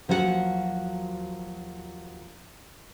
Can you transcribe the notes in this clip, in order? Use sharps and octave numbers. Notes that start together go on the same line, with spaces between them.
D#2 F3 F#3 F#4 G#4 F#5